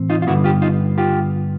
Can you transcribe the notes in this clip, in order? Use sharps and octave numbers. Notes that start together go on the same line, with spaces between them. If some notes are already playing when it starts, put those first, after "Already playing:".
Already playing: A2 E3 A3 C4
D#4 F4
F4
G2 D3 G3 B3 E4 F#4
F4 G4
D#4 F4
F4 G4